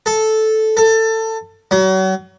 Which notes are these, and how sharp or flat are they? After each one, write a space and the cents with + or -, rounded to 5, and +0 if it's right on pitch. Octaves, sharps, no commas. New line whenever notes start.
A4 -10
A4 +20
F#3 +35